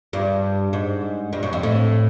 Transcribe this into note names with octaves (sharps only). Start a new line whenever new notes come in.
G2
G#2
G2
F#2
F2
A2